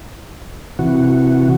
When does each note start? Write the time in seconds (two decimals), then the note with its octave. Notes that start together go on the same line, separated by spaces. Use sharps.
0.79 C3 E3 F#4